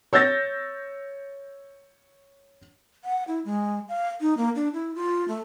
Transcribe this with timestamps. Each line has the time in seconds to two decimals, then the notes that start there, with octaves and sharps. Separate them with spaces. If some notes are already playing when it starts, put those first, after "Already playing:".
0.13 C#5 E6 G6 A6 A#6
3.04 F#5
3.27 E4
3.45 G#3
3.89 F5
4.21 D#4
4.37 A#3
4.55 D4
4.73 E4
4.95 F4
5.28 A3